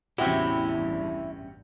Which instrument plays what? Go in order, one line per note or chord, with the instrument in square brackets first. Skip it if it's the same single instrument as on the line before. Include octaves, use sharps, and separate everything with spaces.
[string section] A1 E2 G2 [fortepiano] C3 F#4 [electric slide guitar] C#4 G4 [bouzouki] E4